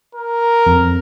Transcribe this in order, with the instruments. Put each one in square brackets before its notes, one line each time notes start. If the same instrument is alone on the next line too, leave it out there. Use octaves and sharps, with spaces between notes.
[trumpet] A#4
[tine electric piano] F2